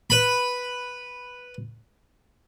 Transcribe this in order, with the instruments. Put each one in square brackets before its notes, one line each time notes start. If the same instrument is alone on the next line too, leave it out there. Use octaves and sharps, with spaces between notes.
[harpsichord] B4 B5